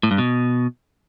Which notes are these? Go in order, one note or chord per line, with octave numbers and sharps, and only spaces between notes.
A2
G2
B2